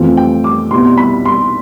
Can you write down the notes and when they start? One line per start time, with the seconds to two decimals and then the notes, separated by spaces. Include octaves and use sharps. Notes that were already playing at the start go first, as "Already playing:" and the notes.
Already playing: F2 E3 A3 C4 F4
0.17 G5
0.44 D6
0.71 C2 B2 G3 B3 E4 C6
0.98 B5
1.26 C6